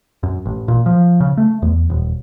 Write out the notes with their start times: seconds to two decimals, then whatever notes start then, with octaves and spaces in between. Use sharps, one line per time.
0.23 F#2
0.46 A1
0.68 A#2
0.86 F3
1.20 C#3
1.37 A3
1.62 E2
1.90 D#1